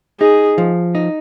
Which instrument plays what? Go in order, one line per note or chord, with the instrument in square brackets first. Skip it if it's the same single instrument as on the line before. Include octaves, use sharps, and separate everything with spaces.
[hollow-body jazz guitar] D#4 [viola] G#4
[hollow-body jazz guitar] F3
D#4